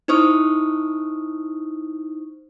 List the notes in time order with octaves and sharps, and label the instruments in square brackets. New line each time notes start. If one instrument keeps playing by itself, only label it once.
[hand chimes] D#4 E4 C5 C#6 D#6 F6